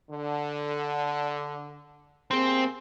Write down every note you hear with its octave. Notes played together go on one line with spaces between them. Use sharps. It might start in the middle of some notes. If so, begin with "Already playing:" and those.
D3
C3 A#3 C4 G#4